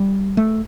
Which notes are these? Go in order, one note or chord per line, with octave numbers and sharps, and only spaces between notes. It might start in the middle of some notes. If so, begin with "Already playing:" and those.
Already playing: G3
A3